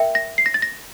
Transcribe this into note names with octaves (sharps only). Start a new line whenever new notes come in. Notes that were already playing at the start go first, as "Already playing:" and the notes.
Already playing: A#4 E5 G5
A#6
C7
A#6
A6
A#6